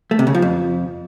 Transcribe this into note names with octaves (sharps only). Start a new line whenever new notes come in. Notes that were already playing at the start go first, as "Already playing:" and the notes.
A3
C3
C#3
F3
F2